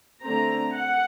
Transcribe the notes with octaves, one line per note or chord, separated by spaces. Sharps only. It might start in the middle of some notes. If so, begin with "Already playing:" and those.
D3 A3 C4 A#5
F#5